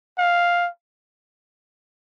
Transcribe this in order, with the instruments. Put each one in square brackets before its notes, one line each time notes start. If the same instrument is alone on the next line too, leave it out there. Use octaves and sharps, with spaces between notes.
[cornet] F5